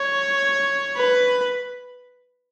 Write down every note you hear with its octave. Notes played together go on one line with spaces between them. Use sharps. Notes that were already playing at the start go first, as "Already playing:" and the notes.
Already playing: C#5
B4